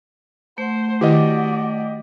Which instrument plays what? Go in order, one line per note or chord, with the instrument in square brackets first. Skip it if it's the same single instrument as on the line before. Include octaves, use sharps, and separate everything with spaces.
[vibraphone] A3 F#5 [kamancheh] C5
[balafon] D#3 E4 [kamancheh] F#4 D5 [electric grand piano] G4 D#5